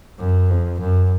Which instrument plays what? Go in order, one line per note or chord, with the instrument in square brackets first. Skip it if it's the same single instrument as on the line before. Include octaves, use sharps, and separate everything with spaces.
[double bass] F#2
F2
F#2